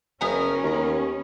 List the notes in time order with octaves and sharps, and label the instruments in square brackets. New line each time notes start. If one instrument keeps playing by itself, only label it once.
[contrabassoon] F#1 [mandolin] B3 G#5 A#5 [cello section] C#4 [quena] A#4
[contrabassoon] D#2